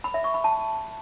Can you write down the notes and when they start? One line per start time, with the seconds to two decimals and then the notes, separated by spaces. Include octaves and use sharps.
0.04 B5
0.14 E5
0.24 C#6
0.34 B5
0.44 A5